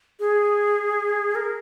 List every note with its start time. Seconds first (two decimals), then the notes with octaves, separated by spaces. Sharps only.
0.20 G#4
1.35 A#4